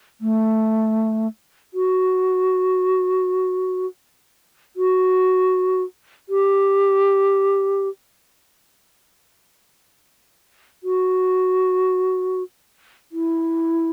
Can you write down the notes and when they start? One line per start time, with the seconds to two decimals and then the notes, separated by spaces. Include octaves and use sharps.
0.21 A3
1.74 F#4
4.76 F#4
6.29 G4
10.84 F#4
13.12 E4